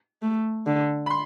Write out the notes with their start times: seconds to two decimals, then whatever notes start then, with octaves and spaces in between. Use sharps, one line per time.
0.22 A3
0.67 D3
1.06 B5
1.10 C6